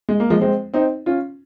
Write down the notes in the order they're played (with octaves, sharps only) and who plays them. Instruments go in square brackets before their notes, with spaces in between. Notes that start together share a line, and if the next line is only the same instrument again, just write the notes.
[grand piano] G#3
A#3
F3 G#3
G#3 C4
C4 D#4
C#4 F4